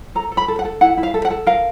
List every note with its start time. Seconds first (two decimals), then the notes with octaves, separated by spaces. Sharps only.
0.15 A4 A#5
0.32 A4
0.37 B5
0.48 A4
0.59 F#5
0.65 A4
0.81 E4 F#5
0.97 E4
1.03 F5
1.14 A4
1.25 F#5
1.31 A4
1.46 A#4 F5